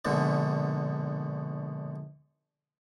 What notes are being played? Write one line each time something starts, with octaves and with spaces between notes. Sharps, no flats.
A#1 G#2 B2 D3